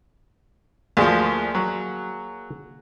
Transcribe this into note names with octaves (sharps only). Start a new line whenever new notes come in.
D2 F3 A#3 G#4 A5
F#3